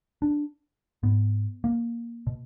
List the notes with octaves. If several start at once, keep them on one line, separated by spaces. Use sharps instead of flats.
D4
G#2 B3
A#3
B2